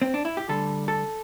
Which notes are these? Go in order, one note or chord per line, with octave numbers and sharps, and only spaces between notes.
C4
D4
E4
G4
D2 D3 G3 A4
A4